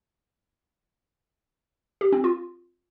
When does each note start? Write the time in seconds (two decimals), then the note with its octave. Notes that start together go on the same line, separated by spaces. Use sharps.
2.01 G4
2.12 C4
2.24 F4